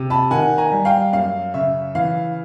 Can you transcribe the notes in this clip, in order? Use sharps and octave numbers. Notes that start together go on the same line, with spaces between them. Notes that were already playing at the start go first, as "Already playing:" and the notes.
Already playing: C3
A5 B5
D#3 F#5 G#5
G#5 A#5
G3
F5 G5
F#2 F5
C#3 E5
E3 F5